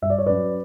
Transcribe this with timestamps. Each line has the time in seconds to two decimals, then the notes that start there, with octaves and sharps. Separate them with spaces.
0.02 G2 E5
0.10 D5
0.18 C#5
0.26 F#3 C#4 B4 D5